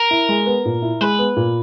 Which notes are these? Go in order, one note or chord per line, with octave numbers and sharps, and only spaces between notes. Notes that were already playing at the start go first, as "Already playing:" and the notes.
Already playing: A#4
E4
G#3
B3
A#2
E4
G#3 B4
B3
A#2